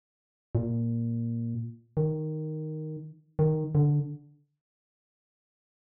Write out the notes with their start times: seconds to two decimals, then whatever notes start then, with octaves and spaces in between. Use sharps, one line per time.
0.55 A#2
1.97 D#3
3.39 D#3
3.75 D3